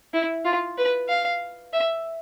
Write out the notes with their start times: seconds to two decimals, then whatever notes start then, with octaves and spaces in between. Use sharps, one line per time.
0.13 E4
0.45 F4
0.78 B4
1.08 F5
1.73 E5